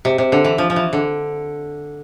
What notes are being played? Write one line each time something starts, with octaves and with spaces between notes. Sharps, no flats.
C3
C3
D3
E3
F3
F3
E3
D3